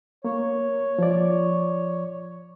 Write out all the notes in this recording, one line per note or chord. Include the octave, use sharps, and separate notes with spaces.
A#3 C#5
F3 D5